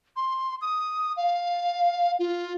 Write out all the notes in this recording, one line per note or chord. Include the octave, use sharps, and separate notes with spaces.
C6
D#6
F5
F4